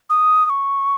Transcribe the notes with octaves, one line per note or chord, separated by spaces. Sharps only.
D#6
D#6
C#6